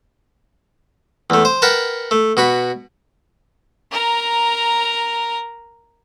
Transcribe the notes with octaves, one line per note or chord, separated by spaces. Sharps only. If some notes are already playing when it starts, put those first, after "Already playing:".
E2 A3
C5
A#4 B4 F#5 G5 A5
A3
B2 F#4 B5
A#4 A#5